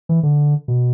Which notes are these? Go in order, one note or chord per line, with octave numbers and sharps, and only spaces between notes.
E3
D3
B2